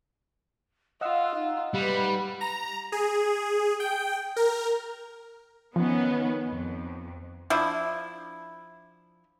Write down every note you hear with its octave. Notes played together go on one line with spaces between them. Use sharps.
F4 D#5 F5 F#5 E6
D#4
G3 B4 F#5
A#5
G#4
G5
A#4
D#3 F3 B3 C#4
F2
F3 D4 E4